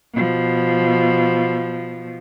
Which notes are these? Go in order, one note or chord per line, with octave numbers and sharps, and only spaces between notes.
B2 F3